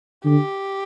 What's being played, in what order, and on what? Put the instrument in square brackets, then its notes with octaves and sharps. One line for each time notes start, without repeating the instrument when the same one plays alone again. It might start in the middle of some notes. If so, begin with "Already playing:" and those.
[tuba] D3 [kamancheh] G4